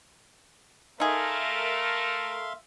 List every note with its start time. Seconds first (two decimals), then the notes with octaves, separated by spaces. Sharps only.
1.00 A3 D#4 G#4 A#4 E5 F5 C6